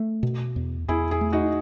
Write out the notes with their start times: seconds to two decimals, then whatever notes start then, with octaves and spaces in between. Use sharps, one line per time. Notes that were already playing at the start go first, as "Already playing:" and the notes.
Already playing: A3
0.23 B2
0.56 E2
0.88 E2 E4 G#4
1.11 E4 G#4
1.21 A3
1.33 D#4 F#4